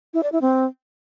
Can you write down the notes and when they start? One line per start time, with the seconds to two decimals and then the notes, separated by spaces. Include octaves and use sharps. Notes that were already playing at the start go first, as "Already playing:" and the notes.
0.14 E4
0.23 D5
0.32 E4
0.42 C4